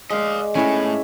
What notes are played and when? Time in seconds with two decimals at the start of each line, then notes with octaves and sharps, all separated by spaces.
0.10 F3 G#3 D5 D#5 F5
0.55 A2 B3 C#4 E4 G#5